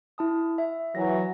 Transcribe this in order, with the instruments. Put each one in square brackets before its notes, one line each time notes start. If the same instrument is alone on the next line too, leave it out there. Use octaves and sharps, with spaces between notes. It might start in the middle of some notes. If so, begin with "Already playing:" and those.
[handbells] E4 A5 D#6
E5
[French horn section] E3 F#3 [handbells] A#6